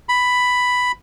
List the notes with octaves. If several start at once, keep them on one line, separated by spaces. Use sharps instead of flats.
B5